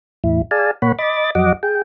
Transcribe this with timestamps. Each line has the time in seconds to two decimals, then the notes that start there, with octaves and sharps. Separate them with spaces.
0.24 E2 A2 E4
0.51 G#4 D5 F5 G#5 A5
0.82 A#2 A#3 C#5 F#5 B5
0.98 D#5 B5 D6 A6
1.35 F2 F#3 D#5 F#5 D6
1.63 G#4 G5